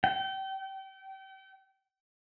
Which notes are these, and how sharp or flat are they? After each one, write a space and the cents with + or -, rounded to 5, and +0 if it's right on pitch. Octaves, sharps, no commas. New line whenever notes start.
G5 -30